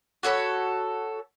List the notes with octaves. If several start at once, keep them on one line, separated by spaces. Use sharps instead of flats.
F#4 A4 C#5 B5